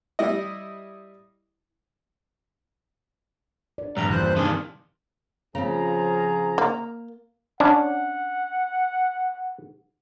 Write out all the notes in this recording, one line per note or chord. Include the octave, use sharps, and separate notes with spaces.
G3 E4 D#5
D5
B1 E2 G2 A#5
A#2 E3 C5 F#6
C3 D#3 A#3 D4 G#4
C#3 F3 C4 F4 G#4 A#5
A#3
C#4 D4 F#5